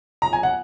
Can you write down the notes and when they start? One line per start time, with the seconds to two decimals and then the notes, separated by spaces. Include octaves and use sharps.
0.22 A#5
0.33 G#5
0.43 F#5